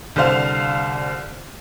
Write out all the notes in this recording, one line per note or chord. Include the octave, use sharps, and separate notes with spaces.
C2 D3 C5 F5